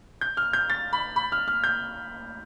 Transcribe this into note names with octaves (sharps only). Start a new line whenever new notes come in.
G6
F6
G6
A6
B5
B5
F6
F6
G6